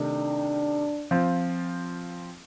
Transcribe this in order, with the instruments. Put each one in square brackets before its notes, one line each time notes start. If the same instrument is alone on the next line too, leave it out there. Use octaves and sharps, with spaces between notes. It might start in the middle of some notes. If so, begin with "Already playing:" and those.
Already playing: [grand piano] C3 D#3 A3 D#4 [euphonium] D4
[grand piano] F3 C4 F4